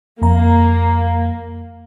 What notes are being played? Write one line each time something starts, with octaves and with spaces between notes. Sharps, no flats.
F2 A#3 A#5